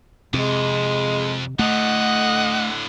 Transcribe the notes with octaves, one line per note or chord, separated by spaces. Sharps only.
F2 C3 G#3
A2 D3 A3 D#5 F#5